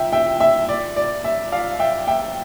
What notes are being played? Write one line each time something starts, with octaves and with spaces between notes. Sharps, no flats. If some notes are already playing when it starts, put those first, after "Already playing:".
Already playing: E5 G5
E5 G5
E5
D5
D5
E5
D5 F5
E5 G5
E5 G5